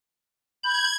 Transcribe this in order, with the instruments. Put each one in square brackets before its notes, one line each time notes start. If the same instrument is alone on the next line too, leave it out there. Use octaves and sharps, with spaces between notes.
[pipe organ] B5 G6 [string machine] G#6